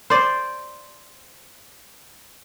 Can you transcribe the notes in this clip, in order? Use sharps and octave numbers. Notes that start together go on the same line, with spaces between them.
C5 D5